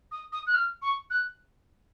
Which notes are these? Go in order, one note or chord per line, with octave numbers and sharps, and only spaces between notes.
D#6
D#6
F#6
F6
C#6
F#6